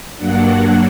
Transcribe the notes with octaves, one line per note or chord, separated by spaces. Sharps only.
G2 F#3 A#3 D4 F#5